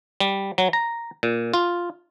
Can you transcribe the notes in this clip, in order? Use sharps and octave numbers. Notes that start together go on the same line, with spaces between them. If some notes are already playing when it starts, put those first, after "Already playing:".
G3
F#3
A#5
A#2
F4